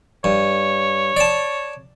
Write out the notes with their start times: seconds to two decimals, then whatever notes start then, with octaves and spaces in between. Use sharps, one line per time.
0.24 G2 C#5
1.17 D5 A5